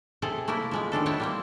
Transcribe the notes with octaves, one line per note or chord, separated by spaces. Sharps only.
C3 G#4 A4
A3 A#3 E4 A#4
F3 G#3 B3
D#3 F3 D4 A4
B3 E4 C5 C#5 A5
G3 A#3 C4